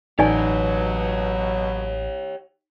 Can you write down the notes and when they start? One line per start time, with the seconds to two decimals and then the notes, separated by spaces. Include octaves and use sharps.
0.19 A1 B2 F#3 D#4 G4 C#5 D5 G#5